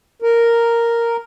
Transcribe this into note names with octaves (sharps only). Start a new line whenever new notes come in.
A#4